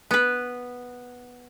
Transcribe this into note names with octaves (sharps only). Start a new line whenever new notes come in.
B3 B4